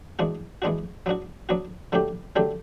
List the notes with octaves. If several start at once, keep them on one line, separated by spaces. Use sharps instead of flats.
E3 G#3 B3 D4 F#4
E3 G#3 B3 D4 F#4
F#3 B3 D4 F#4
F#3 B3 D4 F#4
D3 F#3 A3 D4 G4
D3 F#3 A3 D4 G4